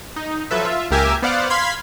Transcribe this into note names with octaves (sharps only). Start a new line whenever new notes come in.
D#4
F3 F#3 A4 B4 E5
F4 E5
C#2 A#3 G4 A#4 E5 G#5
B3 C5 D5 F5 F#5
F5 B5 C6 G#6 B6